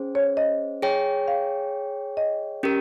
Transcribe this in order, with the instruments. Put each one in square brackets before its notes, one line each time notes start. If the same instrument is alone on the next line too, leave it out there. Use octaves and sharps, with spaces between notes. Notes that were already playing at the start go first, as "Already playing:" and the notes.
Already playing: [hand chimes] C#4 G#4 C5
[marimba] C#5
D#5
[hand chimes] G#4 C#5 G5
[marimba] F5
D#5
[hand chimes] C#4 G4 A#4